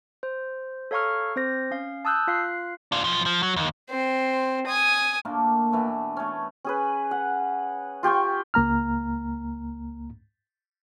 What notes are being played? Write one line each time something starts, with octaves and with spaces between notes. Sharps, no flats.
C5
A4 C#5 F5 A#5 C#6 F6
C4 C5 A#6
C#4 F5
A5 D#6 E6 F#6 G6
F4 F5 F#6 C7
D4 F4
B1 F3
F3
F#3
D#2
C4 C5
G#5 D#6
A#2 A3 A#3 D4
B2 E3 A3
A3 C#4
C#4 G#4 B4
F#5
F4 G4 G5 C#6
C#2 A#3 A#5 F6